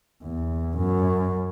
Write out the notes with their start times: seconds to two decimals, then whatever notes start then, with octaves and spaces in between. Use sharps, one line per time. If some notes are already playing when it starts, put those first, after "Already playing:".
0.23 E2
0.77 F#2